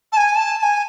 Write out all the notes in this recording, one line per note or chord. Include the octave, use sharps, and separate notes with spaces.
A5
G#5
A5
A5
G#5